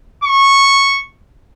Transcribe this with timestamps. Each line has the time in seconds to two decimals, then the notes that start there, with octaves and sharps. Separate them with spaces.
0.24 C#6